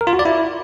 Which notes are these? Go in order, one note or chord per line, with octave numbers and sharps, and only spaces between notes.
A#4
F4
F#4
D5
E4